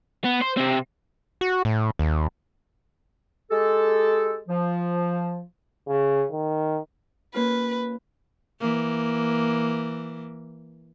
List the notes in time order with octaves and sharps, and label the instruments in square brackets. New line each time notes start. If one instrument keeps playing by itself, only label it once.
[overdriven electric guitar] B3
C5
C3 C4
[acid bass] F#4
A2
D#2
[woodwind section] G#3 G4 A4
F3
[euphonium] C#3
D#3
[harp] A#3 C#4 F4 [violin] B4
[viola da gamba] E3 A#3